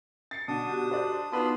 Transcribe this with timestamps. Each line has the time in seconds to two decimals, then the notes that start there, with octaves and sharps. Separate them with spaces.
0.31 A6 C7 C#7
0.48 B2 D3 D4 D#6
0.70 F#4 G4
0.90 A4 C5 D5
1.32 B3 D4 D#4 F4 F#4 B4 D#6